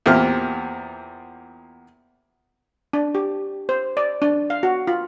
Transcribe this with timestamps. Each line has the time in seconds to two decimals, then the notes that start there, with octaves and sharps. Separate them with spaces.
0.06 E2 A#2 C4 G4 F6
2.93 D4
3.15 G4
3.69 C5
3.97 D5
4.22 D4
4.50 F5
4.63 F#4
4.87 F4